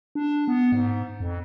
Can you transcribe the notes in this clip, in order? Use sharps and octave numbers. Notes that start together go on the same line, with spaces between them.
D4
B3
G#2
F2